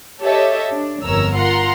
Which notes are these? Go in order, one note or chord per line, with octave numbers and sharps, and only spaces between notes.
G4 A4 C#5 D#5 E5
D4
G1 F2 A#4 C#5 A#5 E6
F4 A#4 F#5 A#5 C6